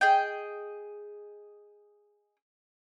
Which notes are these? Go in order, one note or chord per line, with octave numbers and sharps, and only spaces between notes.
G#4 D#5 G5